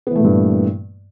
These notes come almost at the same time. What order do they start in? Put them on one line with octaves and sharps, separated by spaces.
B3 E3 A3 A#2 G2